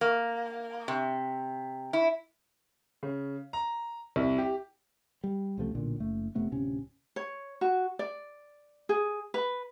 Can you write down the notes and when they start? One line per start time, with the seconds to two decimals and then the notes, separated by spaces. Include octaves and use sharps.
0.01 A#3
0.88 C3
1.93 E4
3.03 C#3
3.53 A#5
4.16 C2
4.38 G4
5.24 G3
5.58 C#2 C3 F3 A3
5.75 B1 A#2 D3
6.00 F#1 A3
6.35 F1 C3 A3 B3
6.52 D1 C3 C#4
7.16 C#5
7.61 F#4
7.99 D5
8.89 G#4
9.34 B4